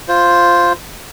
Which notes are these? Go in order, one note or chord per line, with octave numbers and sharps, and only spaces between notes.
F4 C5